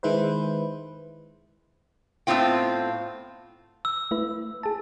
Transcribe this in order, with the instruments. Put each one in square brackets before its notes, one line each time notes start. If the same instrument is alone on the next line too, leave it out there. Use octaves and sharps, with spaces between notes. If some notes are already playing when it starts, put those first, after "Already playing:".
[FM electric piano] D#3 G#3 E4 B4 C5
[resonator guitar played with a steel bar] A2 B3 C4 F4 G5
[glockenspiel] E6
[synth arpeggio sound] A3 E4 B4
G#4 A5